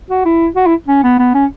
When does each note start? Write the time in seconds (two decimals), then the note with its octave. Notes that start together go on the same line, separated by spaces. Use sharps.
0.10 F#4
0.25 E4
0.56 F#4
0.67 E4
0.88 C#4
1.03 B3
1.19 B3
1.34 C#4